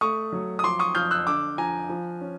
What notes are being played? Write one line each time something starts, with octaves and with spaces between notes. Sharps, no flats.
A3 C#6 D#6
F#3
D#6
F3 C6 D6
C#6 D#6
F3 F6 G6
E6 F#6
D3 D6 E6
F3 G#5 A#5
F3
C#4